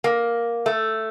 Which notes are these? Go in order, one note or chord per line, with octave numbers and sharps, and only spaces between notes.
A#3
A3